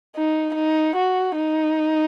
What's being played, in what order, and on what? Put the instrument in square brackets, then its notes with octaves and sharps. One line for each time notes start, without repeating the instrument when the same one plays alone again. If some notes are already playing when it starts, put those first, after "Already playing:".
[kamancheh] D#4
D#4
F#4
D#4